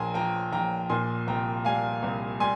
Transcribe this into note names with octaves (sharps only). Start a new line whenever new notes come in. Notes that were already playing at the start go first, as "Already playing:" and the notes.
Already playing: A#1 A#3 G5 G#5 A#5 C6
F3 G5 A#5
A#1 G5 A#5
A#2 G#5 C6
C2 G5 A#5
G3 F5 G#5
C2
G3 G#5 C6